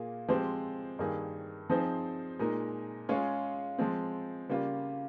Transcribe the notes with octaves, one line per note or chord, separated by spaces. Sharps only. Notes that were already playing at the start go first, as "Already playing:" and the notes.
Already playing: A#2 A#3 F4 G#4
F3 G#3 C4 G4 C5
G2 D#3 A#3 D#4 G#4
F3 C4 D#4 G#4 C5
A#2 G#3 D#4 A#4
G#3 C#4 F4 G#4 C#5
F3 G#3 C4
C#3 G3 A#3 F4